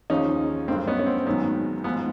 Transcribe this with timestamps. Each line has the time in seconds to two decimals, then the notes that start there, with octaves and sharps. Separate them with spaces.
0.10 D#2 C#3 F3 C#4 D#4
0.68 G2 D3 F#3 A#3 C4
0.87 B3 C#4
0.99 C#4
1.07 C4
1.26 A1 G#2 D#3 F#3 B3
1.84 A1 G#2 F3 B3